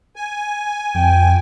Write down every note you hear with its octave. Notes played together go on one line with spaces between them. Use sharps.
G#5
F2 G5